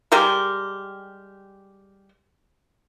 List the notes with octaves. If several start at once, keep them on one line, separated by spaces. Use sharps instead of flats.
G3 G#3 G4 A#4